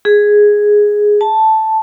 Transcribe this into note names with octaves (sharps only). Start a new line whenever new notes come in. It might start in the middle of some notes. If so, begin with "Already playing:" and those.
G#4
A5